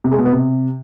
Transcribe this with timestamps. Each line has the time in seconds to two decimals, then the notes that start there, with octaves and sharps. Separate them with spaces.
0.04 C3
0.11 G#3
0.18 B2
0.26 B3
0.33 C3